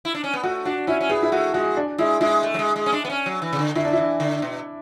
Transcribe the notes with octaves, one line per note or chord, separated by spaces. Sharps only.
E4
D4
C#4
B3
A3 F#4
D4 F#4
C#4 E4
C#4
B3 G#4
E4
A3 F#4
G#3 F#4
D4
G#3 E4
G#3 E4
A3
F#3
G#3
G#3
C#4
D4
B3
C#4
F#3
E3
C#3
D3
D3 E4
D4
E3 E4
D3
B2